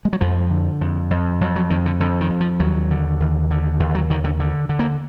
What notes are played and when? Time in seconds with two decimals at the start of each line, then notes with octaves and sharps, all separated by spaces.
0.05 G#3
0.13 F#3
0.21 F2 F3
0.50 D3
0.81 F2
1.10 F2
1.41 F2 F#3
1.56 F#3
1.70 F2 D#3
1.86 D3
2.00 F2 D3
2.21 D#3
2.30 F2
2.40 F3
2.60 D#2 F#3
2.91 D3
3.20 D#2
3.51 D3
3.80 D#2
3.95 F#3
4.10 D3 D#3
4.24 D3
4.40 D3
4.69 D3
4.79 A#3